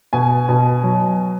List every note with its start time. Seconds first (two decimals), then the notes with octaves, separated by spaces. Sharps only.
0.13 B2 G#5
0.49 B2
0.83 F#3